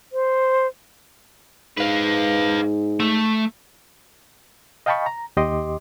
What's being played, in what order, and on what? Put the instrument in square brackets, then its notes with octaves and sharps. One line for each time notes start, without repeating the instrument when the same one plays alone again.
[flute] C5
[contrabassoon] G#2 [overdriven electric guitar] B4 F5
[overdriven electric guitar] A3
[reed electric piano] D#5 F5 G5 A5 B5 C#6
A#5
D#2 G4 D#5 C6 D6